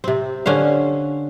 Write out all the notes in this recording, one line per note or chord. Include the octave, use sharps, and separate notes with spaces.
C3 C4
D3 C#4 C5 F5